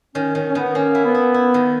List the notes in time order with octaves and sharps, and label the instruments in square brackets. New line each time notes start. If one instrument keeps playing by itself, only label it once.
[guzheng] D#3 [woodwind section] C#4
[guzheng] D#3 [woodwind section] C#4
[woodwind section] C#4
[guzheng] D#3 [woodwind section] B3
[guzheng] A#3 [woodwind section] C#4
[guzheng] E4
[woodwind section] B3
[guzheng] E4
E4
D#3